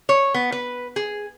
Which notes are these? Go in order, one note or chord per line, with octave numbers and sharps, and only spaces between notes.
C#5
B3
B4
G#4